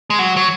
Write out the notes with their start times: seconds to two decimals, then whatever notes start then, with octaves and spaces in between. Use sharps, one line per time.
0.10 G#3
0.19 F#3
0.37 F#3